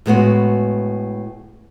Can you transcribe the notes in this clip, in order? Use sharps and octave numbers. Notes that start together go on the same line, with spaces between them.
A2 G#3 B3 F#4